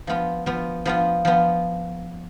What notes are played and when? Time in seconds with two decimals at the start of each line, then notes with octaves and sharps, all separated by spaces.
0.07 F3 B3 F4
0.46 F3 B3 F4
0.85 F3 B3 F4
1.25 F3 B3 F4